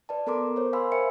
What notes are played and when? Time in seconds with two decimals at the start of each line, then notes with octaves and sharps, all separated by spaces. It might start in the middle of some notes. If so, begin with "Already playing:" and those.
0.09 B4 D5 A5
0.27 B3 A4 A#4 A#5 C6 D6
0.56 A#4 C5 C#5
0.73 F5 G#5 B5 C6 E6
0.92 A#4 C5 E5 G5 G#5 C#7